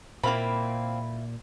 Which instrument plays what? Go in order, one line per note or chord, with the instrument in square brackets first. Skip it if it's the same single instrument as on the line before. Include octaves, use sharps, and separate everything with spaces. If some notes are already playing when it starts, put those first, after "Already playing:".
[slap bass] A#2 [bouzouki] A#3 C4 [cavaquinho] E4 F5 B5